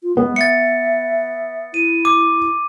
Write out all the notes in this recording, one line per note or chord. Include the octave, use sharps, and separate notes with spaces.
F4
G#3 B3
E5 A6 C#7
E4 D#7
D6